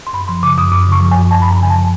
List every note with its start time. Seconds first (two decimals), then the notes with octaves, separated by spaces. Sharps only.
0.07 C6
0.13 F#2 B5
0.28 F3 C6
0.43 C#3 D6
0.57 F#2 D#6
0.72 F#2 D6
0.87 C#3
0.92 C#6
1.01 F3
1.11 G#5
1.17 F#2
1.31 F#2 A5
1.42 B5
1.46 F#2
1.51 A#5
1.61 C#3 G#5
1.70 A5
1.75 F3